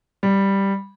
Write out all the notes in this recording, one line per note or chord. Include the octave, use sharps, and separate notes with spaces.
G3